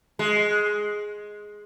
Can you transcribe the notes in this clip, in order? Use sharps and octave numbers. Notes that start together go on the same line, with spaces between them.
G#3